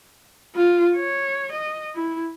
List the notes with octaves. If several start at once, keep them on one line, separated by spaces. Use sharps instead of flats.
F4
C#5
D#5
E4